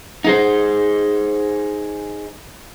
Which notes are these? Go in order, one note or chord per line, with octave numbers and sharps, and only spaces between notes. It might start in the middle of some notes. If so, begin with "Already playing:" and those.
D#4 G#4 C5